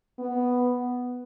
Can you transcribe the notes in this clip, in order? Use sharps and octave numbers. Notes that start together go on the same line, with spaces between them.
B3